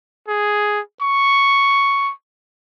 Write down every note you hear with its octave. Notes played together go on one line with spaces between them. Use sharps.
G#4
C#6